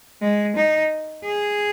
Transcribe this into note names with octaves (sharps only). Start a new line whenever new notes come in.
G#3
D#4
G#4